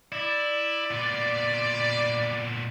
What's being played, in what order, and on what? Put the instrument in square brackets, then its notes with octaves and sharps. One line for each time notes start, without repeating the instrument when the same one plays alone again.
[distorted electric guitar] E4 [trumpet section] D5
[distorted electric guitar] A#2 B3